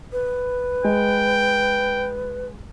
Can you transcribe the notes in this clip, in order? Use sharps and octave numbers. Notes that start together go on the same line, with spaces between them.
B4
G#3 G5